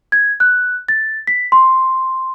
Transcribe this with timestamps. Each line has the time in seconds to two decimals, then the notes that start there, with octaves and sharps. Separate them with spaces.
0.12 G#6
0.40 F#6
0.89 A6
1.27 B6
1.52 C6